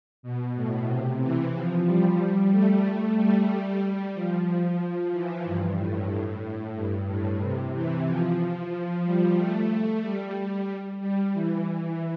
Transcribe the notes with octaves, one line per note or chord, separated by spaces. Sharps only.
B2
A2
C3
E3
F3
G3
A3
G3
G3
G3
F3
E3
G2
A2
A2
G2
A2
C3
E3
F3
F3
G3
A3
A3
G3
G3
G3
E3
E3